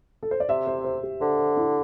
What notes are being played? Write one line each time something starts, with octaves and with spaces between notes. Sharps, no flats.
A4
C5
D5
C3 E5
C5
C5
G4
D3 C5
C5
E4